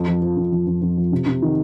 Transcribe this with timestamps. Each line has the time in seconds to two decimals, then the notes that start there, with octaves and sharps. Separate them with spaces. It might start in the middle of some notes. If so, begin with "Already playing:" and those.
Already playing: F2
0.08 F3
0.22 F3
0.37 F2
0.52 F2
0.67 F2
0.82 F2
0.97 F3
1.12 C3
1.26 C3
1.42 D#3